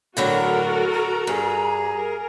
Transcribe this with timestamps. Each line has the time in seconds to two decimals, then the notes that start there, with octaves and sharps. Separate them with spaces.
0.17 A2 D3 F#3 F#4 A4 A#4
0.91 A#5
1.27 G2 G#4
1.95 A#4